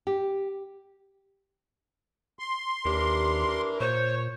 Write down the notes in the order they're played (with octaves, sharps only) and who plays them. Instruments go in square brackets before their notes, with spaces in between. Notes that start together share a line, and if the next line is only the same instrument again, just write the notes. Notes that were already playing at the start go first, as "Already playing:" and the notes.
[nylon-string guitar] G4
[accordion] C6
[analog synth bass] D#2 [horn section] E3 D4 A#4 [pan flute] G4
[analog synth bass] A#2 [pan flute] C5 [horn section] C#5